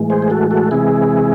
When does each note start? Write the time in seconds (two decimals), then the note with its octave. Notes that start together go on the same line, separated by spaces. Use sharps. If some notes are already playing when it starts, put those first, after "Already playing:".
Already playing: A2 E3 G#3
0.10 G#4 C5
0.22 G#4
0.30 F#4 A4
0.51 F#4 A4
0.71 C3 E3 G#3 E4 G#4